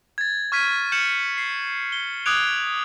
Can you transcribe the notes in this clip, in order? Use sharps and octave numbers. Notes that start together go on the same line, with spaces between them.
G#6 A6
C#6 F6 G#6 B6 D#7
F6 G6 C#7 E7 F#7
C7
G7
D6 D#6 F#6 G#6 D7 F7